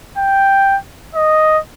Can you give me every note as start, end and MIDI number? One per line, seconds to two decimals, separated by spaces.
0.18 0.77 79
1.15 1.59 75